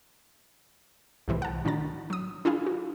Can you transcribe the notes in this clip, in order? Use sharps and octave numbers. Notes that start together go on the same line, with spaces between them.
C2 A2 C3 E3
F#5 A5
A2 D#3 D4 F#4 A#5 A6
F#3 D#6
D4 E4 F4 G#4 F5
F#4